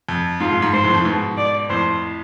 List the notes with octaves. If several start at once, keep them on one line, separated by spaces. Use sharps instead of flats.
F2
G#2 F4
F2
G#2
G#2 C5
F2 A2
F2 A2
G#2 B2
D5
F2 A2 C5